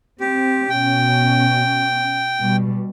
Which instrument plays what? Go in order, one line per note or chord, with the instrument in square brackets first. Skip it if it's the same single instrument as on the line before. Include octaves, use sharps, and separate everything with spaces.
[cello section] C4 [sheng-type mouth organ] G4
[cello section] B2 C#4 [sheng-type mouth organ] G5
[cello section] B2 G3